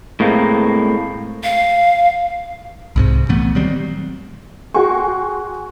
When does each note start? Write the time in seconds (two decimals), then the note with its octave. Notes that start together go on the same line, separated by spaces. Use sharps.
0.20 A2 G#3 A#3 C4
1.43 F5
2.96 C2 G#2 C3
3.29 A#2 E3 A3 B3
3.55 D#3 F#3 G3 C4
4.74 F#4 G#4 G5 C6 C#6